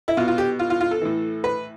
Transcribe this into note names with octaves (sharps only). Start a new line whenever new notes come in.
E4
B2 F4
F4
G4
F4
F4
F4
A4
A2 E3
B4